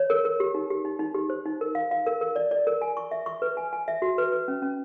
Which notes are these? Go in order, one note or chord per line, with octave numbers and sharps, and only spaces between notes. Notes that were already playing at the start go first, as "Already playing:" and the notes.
Already playing: C#5
A#4
A#4
G4
D#4
G4
D#4
D#4
G4
C5
D#4
A#4
F5
F5
A#4
A#4
D5
D5
A#4
G#5
C#6
E5
C#6
B4
G#5
G#5
E5
F#4
B4
B4
C#4
C#4